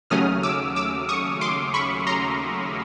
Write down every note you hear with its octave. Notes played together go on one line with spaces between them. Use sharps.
D#2 C#3 F#3 A3 C#4 D#6 F6
D6 E6
D6 E6
C#6 D#6
C6 D6
B5 C#6
A#5 C6